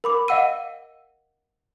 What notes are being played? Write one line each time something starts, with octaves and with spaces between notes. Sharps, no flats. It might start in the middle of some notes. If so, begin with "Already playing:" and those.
A#4 B5 D6
D#5 F5 F#5 E6 D#7